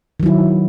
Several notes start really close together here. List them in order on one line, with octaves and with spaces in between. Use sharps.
D#3 F#3 E4